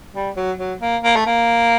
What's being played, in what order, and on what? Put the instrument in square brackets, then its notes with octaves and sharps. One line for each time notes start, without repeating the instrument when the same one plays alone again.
[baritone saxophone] G3
F#3
F#3
A#3
A#3
A3
A#3